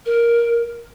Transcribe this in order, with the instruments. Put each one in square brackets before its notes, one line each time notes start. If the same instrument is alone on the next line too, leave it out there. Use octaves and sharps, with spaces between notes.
[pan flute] A#4